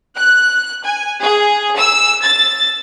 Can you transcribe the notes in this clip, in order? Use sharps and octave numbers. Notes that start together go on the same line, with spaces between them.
F#6
G#5
G#4
E6
A6